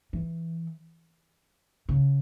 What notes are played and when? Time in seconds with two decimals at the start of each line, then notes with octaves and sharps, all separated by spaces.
0.13 E3
1.89 C#3